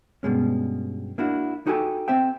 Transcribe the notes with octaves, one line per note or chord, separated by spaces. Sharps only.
G2 B2 G#3 C#4
A#3 D4 E4 F#4
D#4 F#4 G4 A4 G#5
C4 C5 E5 G5